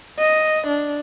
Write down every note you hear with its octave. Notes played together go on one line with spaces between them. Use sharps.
D#5
D4